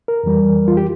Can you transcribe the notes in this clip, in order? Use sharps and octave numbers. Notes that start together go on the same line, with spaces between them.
A#4
F2 E3 G3
F4
G4